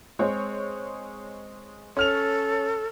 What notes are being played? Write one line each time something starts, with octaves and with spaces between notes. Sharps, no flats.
G#3 C4 C#5
C#4 A4 C#5 F6 F7